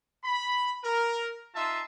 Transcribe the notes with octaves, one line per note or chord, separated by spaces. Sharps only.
B5
A#4
D#4 F4 E5 A5 C6